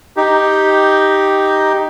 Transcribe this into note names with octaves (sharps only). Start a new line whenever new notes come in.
D#4 G4